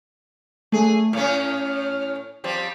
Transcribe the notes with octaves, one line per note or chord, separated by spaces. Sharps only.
F#2 A3 G#4
A2 C#4 F6
F3 G3 C4